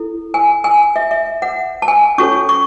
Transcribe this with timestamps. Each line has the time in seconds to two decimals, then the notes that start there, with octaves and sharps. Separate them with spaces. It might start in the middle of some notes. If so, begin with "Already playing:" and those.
Already playing: E4 A4
0.34 G#5
0.64 G#5
0.96 E5
1.11 E5
1.42 F#5
1.82 A5
1.88 G#5
2.18 C#4 F#4 A4 C#5 C#6
2.49 C#6